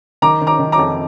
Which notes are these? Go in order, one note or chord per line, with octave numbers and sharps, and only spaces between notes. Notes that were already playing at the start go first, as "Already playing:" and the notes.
D#3 A#5 D6
D#3
A#5 D6
D#3
A#5 D6
F2